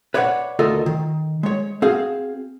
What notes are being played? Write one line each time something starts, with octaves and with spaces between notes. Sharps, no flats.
B4 C#5 D5 E5 F#5
D2 F4 A4 A#4 D#5
D#3
G#3 C#5
C4 F#4 G#4 F5